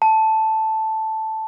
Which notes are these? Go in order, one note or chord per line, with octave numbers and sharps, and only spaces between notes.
A5